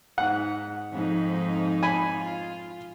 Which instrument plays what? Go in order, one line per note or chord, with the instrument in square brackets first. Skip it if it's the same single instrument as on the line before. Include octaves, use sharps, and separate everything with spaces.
[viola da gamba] G#2 [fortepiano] F#5
[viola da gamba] F2 G#2 D#4
[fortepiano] G#5 B5
[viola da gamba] F4